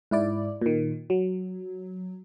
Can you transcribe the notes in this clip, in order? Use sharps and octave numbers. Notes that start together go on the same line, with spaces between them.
G#2 E4 D5
A#2 D#3
F#3